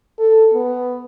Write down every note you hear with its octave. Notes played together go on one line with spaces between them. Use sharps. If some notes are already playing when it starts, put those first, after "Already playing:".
A4
B3